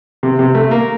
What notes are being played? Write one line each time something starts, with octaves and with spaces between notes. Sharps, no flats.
C3
C3
A3
A#3